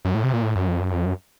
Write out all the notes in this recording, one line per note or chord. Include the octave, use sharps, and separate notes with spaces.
F#2
A2
C3
A#2
A2
F#2
F2
F#2
F2
F#2